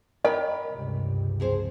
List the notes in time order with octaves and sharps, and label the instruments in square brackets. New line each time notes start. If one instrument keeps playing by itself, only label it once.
[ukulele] A#4 G5 B5 [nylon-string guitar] C#5 [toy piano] D#5
[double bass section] C#2 G2 C3
[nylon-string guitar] F2 G#4 C5